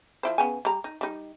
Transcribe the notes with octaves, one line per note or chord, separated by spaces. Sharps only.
F3 E4 C5
C#3 B3 G#5
G3 A#5
D#4
G3 D#4